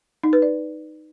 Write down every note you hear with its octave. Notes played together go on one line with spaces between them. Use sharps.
D#4
B4
D5